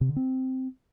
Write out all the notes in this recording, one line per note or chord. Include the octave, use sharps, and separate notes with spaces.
C3
D3
C4